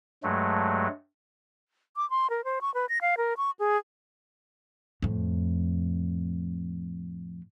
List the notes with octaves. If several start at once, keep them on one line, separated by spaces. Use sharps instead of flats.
G2 F#3 G#3 A3
D6
C6
A#4
C5
C#6
B4
A#6
F5
A#4
C#6
G#4
F2 A2